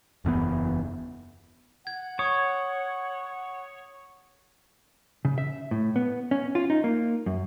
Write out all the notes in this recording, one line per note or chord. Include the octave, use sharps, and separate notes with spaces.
F#1 E2 C#3 B3
F#5 G#6
C#5 C#6 D#6
C#3
E5
A2
B3
C#4
F4
D#4
A#3
F#2